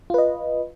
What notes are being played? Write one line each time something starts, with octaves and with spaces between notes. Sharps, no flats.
F4 B4 D#5